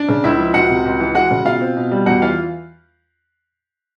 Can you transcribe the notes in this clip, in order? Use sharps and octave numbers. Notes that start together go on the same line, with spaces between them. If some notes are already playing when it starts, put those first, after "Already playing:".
Already playing: D4 D5
C#3
C#2 E4 E5
F3
C#2 F#4 F#5
C3
C#2
E3
G#3 F#4 F#5
C#3
B2 F4 F5
C4
B2
G3
E2 F#4 F#5
E3 F4 F5